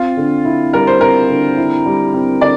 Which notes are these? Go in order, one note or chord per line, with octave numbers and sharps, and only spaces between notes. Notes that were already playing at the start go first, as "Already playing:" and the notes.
Already playing: C4 F4
D3
E4
G3 A#4
C5
C4 A#4
D3
E4
G3
C4
D3 D5